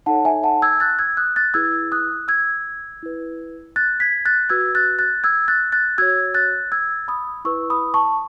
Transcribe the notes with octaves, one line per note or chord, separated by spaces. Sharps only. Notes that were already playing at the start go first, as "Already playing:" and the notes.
D#4 A4 C#5 F#5 A5
E5 G#5
F#5 A5
E6 G#6
F#6 A6
E6 G#6
D#6 F#6
F#6 A6
E4 G#4 B4 E6 G#6
D#6 F#6
E6 G#6
E4 B4
F#6 A6
G#6 B6
F#6 A6
F#4 B4 E6 G#6
F#6 A6
F#6 A6
E6 G#6
F#6 A6
F#6 A6
F#4 C#5 E6 G#6
F#6 A6
E6 G#6
B5 D#6
E4 B4 C#6 E6
B5 D#6
A5 C#6